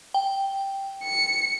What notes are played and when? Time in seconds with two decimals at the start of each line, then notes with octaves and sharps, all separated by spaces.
0.14 G5
1.03 C#7